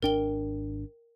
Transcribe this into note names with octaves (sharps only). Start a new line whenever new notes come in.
G#1 D4 A#4 G5 G7